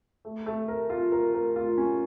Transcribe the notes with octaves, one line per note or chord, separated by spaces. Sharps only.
A3
A3
A#4
F4
A#4
A#4
F4
C#4